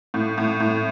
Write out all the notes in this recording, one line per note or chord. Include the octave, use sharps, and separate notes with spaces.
A2
A2
A2